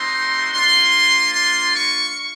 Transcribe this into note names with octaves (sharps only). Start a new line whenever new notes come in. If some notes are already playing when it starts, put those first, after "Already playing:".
Already playing: A3 C4 D#4 F#4 C6
A#3 D4 F4 C6
C6
C#6